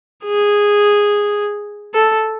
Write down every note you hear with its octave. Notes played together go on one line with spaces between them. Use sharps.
G#4
A4